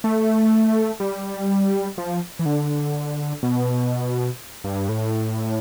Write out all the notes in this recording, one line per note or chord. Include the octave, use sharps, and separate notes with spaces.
A3
G3
F3
E3
D3
B2
G2
A2